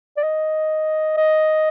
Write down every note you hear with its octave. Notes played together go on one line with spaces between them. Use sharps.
D5
D#5
D#5